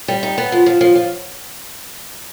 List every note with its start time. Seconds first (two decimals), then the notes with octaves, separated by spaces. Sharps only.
0.08 G3
0.23 D#4
0.38 B3
0.52 F3
0.66 F3
0.81 F3
0.95 F3